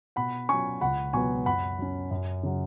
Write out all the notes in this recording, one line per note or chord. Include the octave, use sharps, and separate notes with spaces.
B2 F#5 B5
F#3 C#4 G#5 C#6
C#2 F#5 B5
B2 F#3 B3 G#5 C#6
F#2 F#5 B5
F#3 C#4
F#2
C#3 F#3